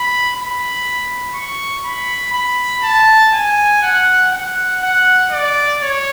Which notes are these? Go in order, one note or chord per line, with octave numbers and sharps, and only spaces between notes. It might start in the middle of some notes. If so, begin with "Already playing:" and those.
Already playing: B5
B5
C#6
B5
B5
A5
G#5
F#5
F#5
F#5
D5
C#5